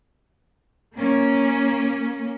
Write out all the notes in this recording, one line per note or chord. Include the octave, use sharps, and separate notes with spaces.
A#3 C#4